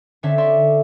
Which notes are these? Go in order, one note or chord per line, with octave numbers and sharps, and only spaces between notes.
D3 C4 C#4 A4 E5 B6
D5 E5 C6 C#6